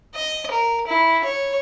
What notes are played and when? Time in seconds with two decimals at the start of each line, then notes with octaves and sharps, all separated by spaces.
0.15 D#5
0.51 A#4
0.87 E4
1.25 C#5